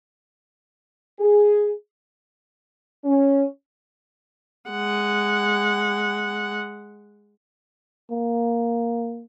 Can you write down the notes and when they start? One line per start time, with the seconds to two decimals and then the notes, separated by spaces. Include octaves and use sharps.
1.20 G#4
3.04 C#4
4.70 G#3 F#5
8.11 A#3